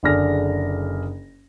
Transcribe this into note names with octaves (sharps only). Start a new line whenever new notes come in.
F#1 D3 D4 G#4 F6 A#6